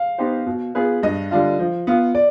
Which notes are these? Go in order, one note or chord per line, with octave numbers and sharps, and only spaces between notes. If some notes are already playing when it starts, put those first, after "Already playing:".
Already playing: F5
B3 D#4 G4 C5
B2
B3 F4 G#4 B4
G2 D#5
D3 G3 D4 F4
F3
B3 F4
D5